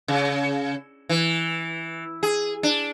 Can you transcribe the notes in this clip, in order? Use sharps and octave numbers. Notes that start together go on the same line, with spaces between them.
C#3
E3
G#4
D4